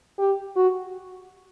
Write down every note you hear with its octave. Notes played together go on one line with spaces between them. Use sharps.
G4
F#4